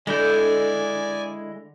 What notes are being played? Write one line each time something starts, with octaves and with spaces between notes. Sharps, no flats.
D3 G#3 E4 D5 G#5 G6